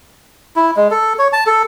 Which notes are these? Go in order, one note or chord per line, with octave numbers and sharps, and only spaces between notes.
E4
G#3
A4
C#5
A5
A4